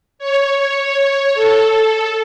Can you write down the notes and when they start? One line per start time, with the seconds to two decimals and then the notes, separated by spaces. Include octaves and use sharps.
0.19 C#5
1.34 A4